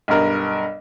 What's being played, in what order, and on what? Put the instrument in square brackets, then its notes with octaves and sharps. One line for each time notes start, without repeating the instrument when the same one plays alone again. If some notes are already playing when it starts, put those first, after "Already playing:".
[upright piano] B1 G2 A#4